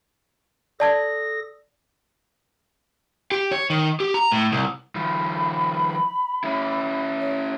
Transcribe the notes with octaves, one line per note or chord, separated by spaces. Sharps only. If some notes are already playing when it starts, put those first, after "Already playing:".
A4 D5 A5 D#6 G#6 A#6
G4
C#5
D#3
G4
A#5
A2
C2
D#3 F3 B5
C#4 E4
C#5